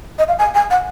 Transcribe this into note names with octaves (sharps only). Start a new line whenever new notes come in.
D#5
F5
G#5
G#5
F#5